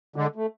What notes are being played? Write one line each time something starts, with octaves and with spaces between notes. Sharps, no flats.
D3 G#3
A3